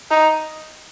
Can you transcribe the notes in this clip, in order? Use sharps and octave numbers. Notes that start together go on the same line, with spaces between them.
D#4